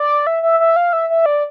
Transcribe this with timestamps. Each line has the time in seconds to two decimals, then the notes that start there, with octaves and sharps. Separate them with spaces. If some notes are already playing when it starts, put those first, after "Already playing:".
Already playing: D5
0.27 E5
0.43 E5
0.60 E5
0.76 F5
0.93 E5
1.10 E5
1.26 D5